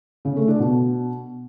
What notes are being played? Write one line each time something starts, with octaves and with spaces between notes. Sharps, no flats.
C#3
A3
D4
B2